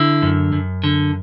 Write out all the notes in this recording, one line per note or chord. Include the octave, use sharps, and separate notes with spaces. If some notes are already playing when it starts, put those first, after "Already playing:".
Already playing: D3 E4
F#2
F#2
D3